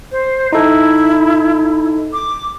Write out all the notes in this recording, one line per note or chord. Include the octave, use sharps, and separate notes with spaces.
C5
D#4 E4 A4
D6